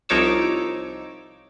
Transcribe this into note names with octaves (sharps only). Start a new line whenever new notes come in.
C2 F3 D#4 C#5 D6 E6